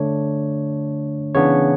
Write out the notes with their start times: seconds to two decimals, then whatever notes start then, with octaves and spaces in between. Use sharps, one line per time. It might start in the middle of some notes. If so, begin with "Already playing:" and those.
Already playing: D3 A3 D4 C#5
1.35 C#3 E3 B3 D4 C#5